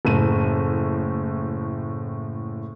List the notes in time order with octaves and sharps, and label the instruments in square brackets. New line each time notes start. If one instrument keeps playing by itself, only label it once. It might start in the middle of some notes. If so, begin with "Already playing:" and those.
[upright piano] F#1 A2 D#7